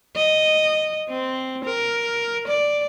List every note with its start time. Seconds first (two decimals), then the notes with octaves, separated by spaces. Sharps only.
0.16 D#5
1.09 C4
1.65 A#4
2.47 D5